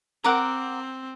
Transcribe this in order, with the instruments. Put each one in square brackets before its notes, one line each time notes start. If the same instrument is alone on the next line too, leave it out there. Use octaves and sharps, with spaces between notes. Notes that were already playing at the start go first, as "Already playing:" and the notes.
[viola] C4 [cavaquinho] A#4 F#5 A#5 D6